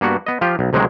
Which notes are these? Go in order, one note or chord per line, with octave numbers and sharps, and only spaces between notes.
G2 A#3 B3 F#4
B3 D#5
F3 F4 G4
B1
D2 C3 D#3 F#3 G#3